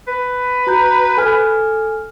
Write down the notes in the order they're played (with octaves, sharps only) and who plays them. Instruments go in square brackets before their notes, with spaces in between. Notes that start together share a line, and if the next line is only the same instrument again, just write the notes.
[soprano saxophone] B4
[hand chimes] F#4 A#5 G6
A4 G#5 F6